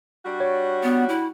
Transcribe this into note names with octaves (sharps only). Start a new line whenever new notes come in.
G3 D4 F#4
C#5
B3
E4